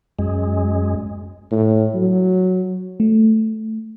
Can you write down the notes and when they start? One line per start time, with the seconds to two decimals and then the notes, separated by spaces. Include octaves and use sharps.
0.19 F#2 G#3
1.51 A2
1.95 F#3
3.00 A3